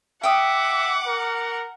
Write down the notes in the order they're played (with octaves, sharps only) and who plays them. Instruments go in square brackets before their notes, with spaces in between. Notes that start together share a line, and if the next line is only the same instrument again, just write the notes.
[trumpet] E5 [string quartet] F#5 [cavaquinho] G5 D#6 [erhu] D6
[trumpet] A#4